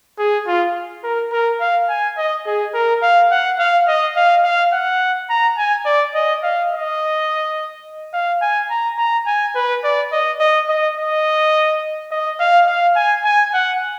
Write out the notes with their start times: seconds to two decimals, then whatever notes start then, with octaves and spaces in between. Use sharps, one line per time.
0.18 G#4
0.47 F4
1.04 A#4
1.32 A#4
1.60 F5
1.89 G#5
2.17 D#5
2.46 G#4
2.74 A#4
3.02 F5
3.31 F#5
3.59 F5
3.88 D#5
4.16 F5
4.44 F5
4.73 F#5
5.29 A#5
5.58 G#5
5.86 D5
6.15 D#5
6.43 F5
6.72 D#5
8.14 F5
8.42 G#5
8.70 A#5
8.98 A#5
9.26 G#5
9.55 B4
9.84 D5
10.12 D#5
10.40 D#5
10.68 D#5
10.97 D#5
12.11 D#5
12.40 F5
12.67 F5
12.96 G#5
13.24 G#5
13.53 F#5